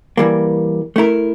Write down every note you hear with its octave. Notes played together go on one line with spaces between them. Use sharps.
E3 G3 A#3
A3 E4 A#4